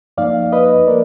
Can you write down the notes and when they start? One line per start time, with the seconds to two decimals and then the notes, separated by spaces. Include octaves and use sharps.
0.18 F#2 F3 A#3 D#4 D5 F5
0.52 B4 D#5
0.87 F3 A#3 A#4 D5